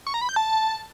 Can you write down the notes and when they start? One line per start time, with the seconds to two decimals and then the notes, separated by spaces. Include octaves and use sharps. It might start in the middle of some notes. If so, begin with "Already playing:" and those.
0.07 C#6
0.14 A#5
0.21 B5
0.29 G6
0.36 A5